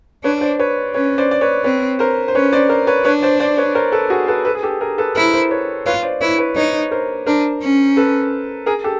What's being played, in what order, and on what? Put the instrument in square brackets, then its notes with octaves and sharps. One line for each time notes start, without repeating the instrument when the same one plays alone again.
[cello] D4 [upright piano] B4 C#5
[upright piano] C5 D5
B4 C#5
[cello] C#4 [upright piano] B4 C#5
[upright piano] C5 D5
D5
B4 C#5
[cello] C4 [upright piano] B4 C#5
[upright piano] A#4 C5
C5
[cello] C#4 [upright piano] B4 C#5
[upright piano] C5 D5
A#4 C5
B4 C#5
[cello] D4 [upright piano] B4 C#5
[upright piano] C5 D5
C5 D5
B4 C#5
A#4 C5
A4 B4
F#4 G#4
A4 B4
A4 B4
G#4
G4 A4
G#4 A#4
A4 B4
[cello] E4 [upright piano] A#4 C5
[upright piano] A#4 C5
B4 C#5
[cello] F4 [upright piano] B4 C#5
[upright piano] C5 D5
[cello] E4 [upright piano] B4 C#5
[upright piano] B4 C#5
[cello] D#4 [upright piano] B4 C#5
[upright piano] A#4 C5
[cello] D4 [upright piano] A#4 C5
[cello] C#4
[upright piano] A4 B4
G#4 A#4
G4 A4